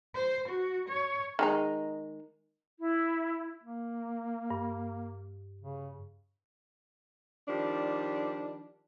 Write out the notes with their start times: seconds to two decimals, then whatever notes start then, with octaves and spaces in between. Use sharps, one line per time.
0.15 C5
0.48 F#4
0.89 C#5
1.39 D#3 G#3 D#4
2.79 E4
3.63 A#3
4.50 G2
5.62 C#3
7.48 D#3 F3 G3 D4